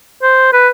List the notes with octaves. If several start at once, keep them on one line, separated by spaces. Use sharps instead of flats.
C5
B4